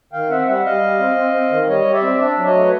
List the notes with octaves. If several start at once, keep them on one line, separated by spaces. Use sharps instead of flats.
D#3 F5 G5
C4 E5 F#5
G3 E5 F#5
G3 D#5 F5
G3
C4
C4
C4
D#3
G3 C#5 D#5
G3
D5 E5
C4
D4 D5 E5
F#3
C#5 D#5
A3
B4